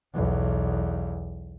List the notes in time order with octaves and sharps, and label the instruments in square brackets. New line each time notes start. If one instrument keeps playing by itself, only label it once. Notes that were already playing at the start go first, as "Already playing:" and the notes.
[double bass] B1 E2